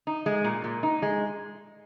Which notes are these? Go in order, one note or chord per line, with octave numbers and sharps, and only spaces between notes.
D#4
G#3
A#2
A#2
D#4
G#3